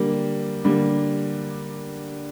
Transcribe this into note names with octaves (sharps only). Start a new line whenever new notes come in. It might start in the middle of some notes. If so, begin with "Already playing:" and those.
Already playing: D3 G3 A#3
D3 G3 A#3